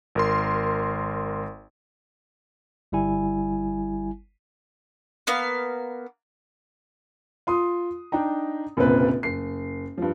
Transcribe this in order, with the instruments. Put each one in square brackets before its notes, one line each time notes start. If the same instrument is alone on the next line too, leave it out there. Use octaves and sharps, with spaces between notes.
[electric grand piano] G#1 A#4 C6
[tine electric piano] G1 G3 E4 G#5
[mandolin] A#3 B3 F5
[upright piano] F4 C6 D#6
D4 D#4 G5 A#5
F1 A#1 C#3 A#3 C4 B4
F#1 C7
G2 F3